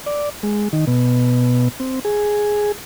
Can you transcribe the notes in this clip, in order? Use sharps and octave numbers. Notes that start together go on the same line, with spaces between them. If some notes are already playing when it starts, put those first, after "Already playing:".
D5
G#3
D#3
B2
C4
G#4